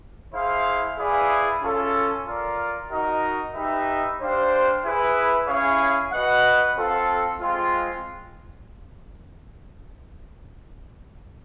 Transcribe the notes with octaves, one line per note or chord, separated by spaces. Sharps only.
E4 G#4 C5 F5
E4 G#4 B4 D5 F5
C#4 F4 A4
F4 A#4 D5
D#4 F#4 A#4 D#5
D#4 G4 B4 E5
D4 G4 C5 F5
E4 G#4 B4
C#4 E4 G#4 C#5 F5
F#4 B4 D#5 F#5
C4 F4 A4
G#3 C4 F4